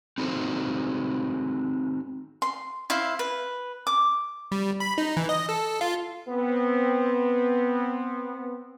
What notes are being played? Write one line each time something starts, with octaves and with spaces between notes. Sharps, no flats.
C4 D#4 F#4 A4 C5
C6
E4 C5 E5 F5
B4
D6
G3
B5
D#4
E3
D#5
A4
F4
B3 C4